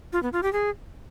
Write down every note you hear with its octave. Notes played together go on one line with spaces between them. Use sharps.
F4
B3
F4
G4
G#4